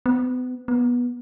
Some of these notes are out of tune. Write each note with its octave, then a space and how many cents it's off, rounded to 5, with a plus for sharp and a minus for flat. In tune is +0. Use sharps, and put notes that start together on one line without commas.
B3 +35
B3 -15